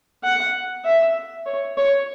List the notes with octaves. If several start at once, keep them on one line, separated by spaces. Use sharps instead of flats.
F#5
E5
C#5
C#5